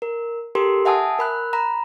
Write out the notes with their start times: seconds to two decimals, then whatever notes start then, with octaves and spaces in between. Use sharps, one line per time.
0.02 A#4
0.55 G4 A4 A#4 C6
0.85 E5 F#5 G#5 A5 D#6
1.19 A#4 B5 F#6
1.53 A#5 B5